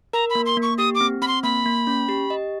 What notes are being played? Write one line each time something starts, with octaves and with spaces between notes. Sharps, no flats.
A#4 A#5
B5
A#3
C6
A#3
C#6
G4 D#6
D6
C4
C4 B5
C6
A#3 B5
A#3
C#4
G4
D#5